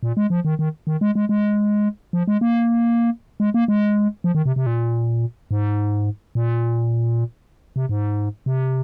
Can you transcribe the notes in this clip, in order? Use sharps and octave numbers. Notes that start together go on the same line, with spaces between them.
A#2
G#3
F3
D#3
D#3
D#3
G#3
G#3
G#3
F3
G#3
A#3
G#3
A#3
G#3
F3
D#3
C3
C3
A#2
G#2
A#2
C3
G#2
C3